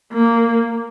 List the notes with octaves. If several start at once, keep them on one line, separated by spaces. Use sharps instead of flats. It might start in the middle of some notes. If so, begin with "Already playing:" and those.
A#3